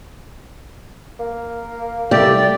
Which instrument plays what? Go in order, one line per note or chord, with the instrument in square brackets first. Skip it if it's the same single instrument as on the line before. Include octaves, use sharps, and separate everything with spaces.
[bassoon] A#3
[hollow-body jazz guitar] C2 A3 [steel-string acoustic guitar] G4 [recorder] D5